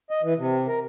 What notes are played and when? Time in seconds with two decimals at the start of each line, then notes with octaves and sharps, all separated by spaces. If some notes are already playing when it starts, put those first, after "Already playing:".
0.11 D#5
0.23 E3
0.38 C3
0.68 A#4